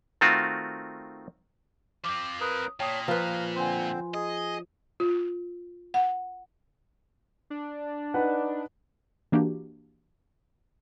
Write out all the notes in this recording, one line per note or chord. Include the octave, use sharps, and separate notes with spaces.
D#3 A3 C4 F4 F#4
F3 C4 D6
A#4 B4 A#5 D#6
A#2 C#5 G5 A5 D#6
F3 B4 A#5 F6
D3 C4 C5 G#5 C6
G#4 D#5
F4
F#5
D4
D#4 B4 F#5
E3 A#3 D4 F#4 G4